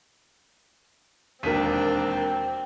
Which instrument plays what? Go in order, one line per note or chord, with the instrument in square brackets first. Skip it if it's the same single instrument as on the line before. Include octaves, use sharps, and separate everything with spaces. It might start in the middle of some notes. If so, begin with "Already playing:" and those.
[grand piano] E1 D#2 B6 [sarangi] C4 [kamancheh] D4 [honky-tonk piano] A#4 D#7